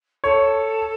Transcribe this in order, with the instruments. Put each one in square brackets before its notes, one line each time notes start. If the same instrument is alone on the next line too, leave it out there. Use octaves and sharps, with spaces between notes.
[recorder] A4 [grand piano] C#5